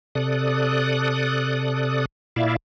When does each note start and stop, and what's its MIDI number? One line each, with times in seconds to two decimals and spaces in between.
0.15 2.05 48
0.15 2.05 69
0.15 2.05 74
0.15 2.05 87
0.15 2.05 90
2.36 2.56 46
2.36 2.56 64
2.36 2.56 74
2.36 2.56 76
2.36 2.56 77